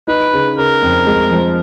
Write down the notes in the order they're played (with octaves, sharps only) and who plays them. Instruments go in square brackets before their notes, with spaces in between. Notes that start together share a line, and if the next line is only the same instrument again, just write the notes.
[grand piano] D#4 [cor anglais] B4
[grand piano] C#3
[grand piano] C#3 [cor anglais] A#4
[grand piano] F2
G#3
F3